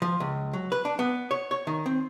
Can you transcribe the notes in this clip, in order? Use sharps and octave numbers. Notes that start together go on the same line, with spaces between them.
F3
C#2
F#3
B4
D4
B3
C#5
C#5
D#3
C4